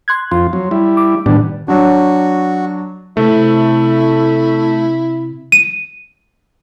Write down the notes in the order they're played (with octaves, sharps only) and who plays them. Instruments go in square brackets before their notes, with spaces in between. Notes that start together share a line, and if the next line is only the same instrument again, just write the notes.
[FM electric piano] C6 F#6 G#6
[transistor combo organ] F2 F4 [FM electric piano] C6
[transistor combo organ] F#3
G3 E4
[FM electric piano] D6
[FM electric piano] A2 D#3 [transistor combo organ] G3 B3 D4
[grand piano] F#3 D4 [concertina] F#4
[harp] C3 [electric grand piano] A3 [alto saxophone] E4
[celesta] D#7